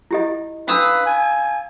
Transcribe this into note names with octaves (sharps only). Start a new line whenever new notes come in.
E4 G4 D#5
C#4 D4 B4 F5 D#6 E6
G#5